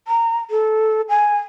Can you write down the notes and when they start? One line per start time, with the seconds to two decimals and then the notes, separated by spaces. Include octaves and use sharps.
0.08 A#5
0.50 A4
1.09 G#5